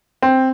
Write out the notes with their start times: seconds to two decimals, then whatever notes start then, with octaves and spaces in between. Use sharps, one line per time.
0.22 C4